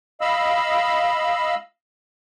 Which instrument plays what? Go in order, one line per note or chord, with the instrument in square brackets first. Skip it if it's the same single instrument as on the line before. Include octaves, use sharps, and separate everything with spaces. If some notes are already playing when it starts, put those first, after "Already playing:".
[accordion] D#5 F5 B5 E6